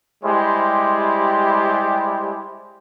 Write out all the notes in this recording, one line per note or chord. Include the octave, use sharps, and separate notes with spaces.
G3 G#3 E4 G4 C5